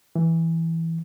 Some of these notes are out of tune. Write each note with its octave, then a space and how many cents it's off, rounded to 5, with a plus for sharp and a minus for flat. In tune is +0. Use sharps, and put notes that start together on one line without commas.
E3 -5